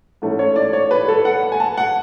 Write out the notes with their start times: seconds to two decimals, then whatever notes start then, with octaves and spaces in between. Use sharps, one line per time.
0.22 G#2 E3 A3 C#4
0.39 C#5
0.56 D5
0.73 C#5
0.91 B4
1.08 A4
1.25 F#5
1.52 G#5
1.60 A5
1.77 F#5